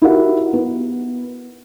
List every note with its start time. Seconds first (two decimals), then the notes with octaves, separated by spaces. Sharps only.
0.02 E4 F#4 G4 A#4 F#5
0.53 B3